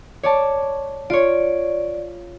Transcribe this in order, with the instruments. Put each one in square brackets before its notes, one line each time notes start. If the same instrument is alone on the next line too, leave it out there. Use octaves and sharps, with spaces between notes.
[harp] C#5 D5 A5
[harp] F4 C#5 [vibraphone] D5